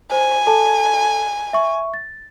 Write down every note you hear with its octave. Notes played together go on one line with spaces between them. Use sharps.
C5 G#5
A4 A5
E5 C#6
A6